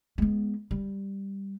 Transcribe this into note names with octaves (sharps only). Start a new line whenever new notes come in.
G#3 B3
G3